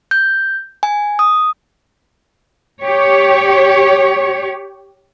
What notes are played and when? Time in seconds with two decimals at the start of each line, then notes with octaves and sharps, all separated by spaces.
0.11 G6
0.83 G#5
1.19 D#6
2.82 G4 C#5